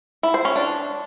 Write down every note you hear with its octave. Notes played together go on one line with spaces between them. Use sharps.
E4
C5
C#4
D4